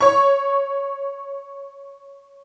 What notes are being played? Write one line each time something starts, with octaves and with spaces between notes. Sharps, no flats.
C#5 C#6